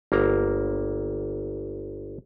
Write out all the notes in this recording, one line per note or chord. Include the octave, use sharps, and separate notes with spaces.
G1 A#3 A#5